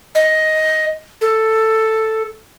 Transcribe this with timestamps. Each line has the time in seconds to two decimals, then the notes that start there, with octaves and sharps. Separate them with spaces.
0.15 D#5
1.21 A4